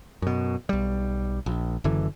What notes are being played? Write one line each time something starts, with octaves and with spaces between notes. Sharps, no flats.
F#2 B2
B1 G3
A#1
F#1 F#2 D3 E3